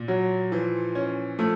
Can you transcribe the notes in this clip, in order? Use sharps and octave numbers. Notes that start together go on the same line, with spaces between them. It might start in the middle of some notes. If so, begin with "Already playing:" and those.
Already playing: A#2
F#3
E3 F3
C#4
F3 A3